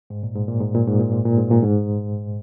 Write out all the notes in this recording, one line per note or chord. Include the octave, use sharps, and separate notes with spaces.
G#2
A#2
G#2
A#2
G#2
A#2
G#2
A#2
G#2
A#2
G#2
A#2
G#2